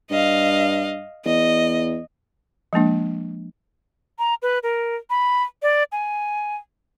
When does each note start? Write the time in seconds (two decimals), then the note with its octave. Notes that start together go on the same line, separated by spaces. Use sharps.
0.11 G2 D#5 F5
1.25 E2 D#5
2.73 F3 G#3 A#3 D4
4.19 A#5
4.42 B4
4.63 A#4
5.10 B5
5.62 D5
5.92 G#5